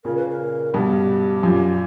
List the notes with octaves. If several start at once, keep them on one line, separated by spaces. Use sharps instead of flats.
A#2 C#3 A#4
B4
A#4
G2 B2 G4
F#2 A#2